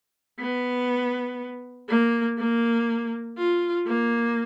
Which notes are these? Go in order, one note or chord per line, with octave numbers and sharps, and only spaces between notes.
B3
A#3
A#3
F4
A#3